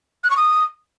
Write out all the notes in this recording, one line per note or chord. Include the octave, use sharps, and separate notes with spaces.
F#6
C#6
D#6